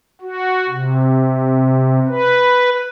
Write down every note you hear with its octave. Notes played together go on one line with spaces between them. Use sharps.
F#4
C3
B4